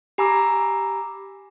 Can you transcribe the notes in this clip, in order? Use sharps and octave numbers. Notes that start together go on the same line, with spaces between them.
G4 G#5 A#5 B5 D6 E6